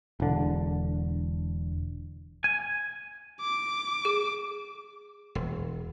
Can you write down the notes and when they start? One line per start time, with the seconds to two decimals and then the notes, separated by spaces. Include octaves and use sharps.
0.20 E1 D3
2.44 G#5
3.41 D6
4.05 G#4
5.35 E1